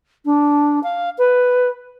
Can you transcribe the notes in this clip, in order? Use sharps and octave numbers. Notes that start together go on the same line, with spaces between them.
D4
F5
B4